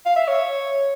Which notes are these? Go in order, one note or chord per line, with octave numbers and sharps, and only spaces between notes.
F5
E5
C#5